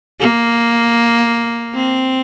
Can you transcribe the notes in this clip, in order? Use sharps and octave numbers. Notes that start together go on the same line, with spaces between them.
A#3
C4